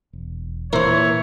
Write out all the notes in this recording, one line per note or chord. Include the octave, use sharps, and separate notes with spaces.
E1
A#2 E3 A#4 C5 C#5